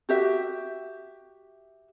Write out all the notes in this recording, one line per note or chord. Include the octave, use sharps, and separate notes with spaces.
F#4 G4 E5